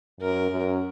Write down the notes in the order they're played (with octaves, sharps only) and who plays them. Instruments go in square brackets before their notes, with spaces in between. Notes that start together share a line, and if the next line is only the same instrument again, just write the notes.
[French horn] F#2 [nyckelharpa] A#4
[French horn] F#2